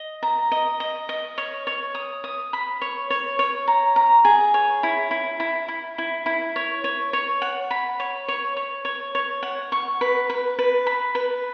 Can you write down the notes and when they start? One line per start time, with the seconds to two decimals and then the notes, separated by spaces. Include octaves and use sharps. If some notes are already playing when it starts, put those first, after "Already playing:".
Already playing: D#5
0.23 A#5
0.52 D#5
0.80 D#5
1.09 D#5
1.38 C#5
1.67 C#5
1.95 D#6
2.24 D#6
2.53 B5
2.82 C#5
3.10 C#5
3.39 C#5
3.68 A#5
3.96 A#5
4.25 G#4
4.54 C#5
4.83 E4
5.11 E4
5.40 E4
5.68 E4
5.98 E4
6.26 E4
6.56 C#5
6.84 C#5
7.13 C#5
7.42 F#5
7.71 B5
8.00 C#5
8.28 C#5
8.57 C#5
8.85 C#5
9.15 C#5
9.43 F#5
9.72 C#6
10.01 B4
10.30 B4
10.59 B4
10.87 B5
11.15 B4